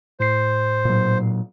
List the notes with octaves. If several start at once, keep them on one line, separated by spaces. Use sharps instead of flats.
A2 C5 C7
A#2 F#3